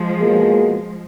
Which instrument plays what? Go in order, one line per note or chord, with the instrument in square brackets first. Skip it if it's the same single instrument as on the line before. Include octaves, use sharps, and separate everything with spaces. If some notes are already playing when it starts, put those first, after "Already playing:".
Already playing: [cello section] F3 G#3
[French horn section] B2 A#3 F4 G#4